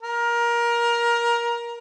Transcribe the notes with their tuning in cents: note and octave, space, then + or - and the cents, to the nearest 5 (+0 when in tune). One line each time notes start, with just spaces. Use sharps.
A#4 +20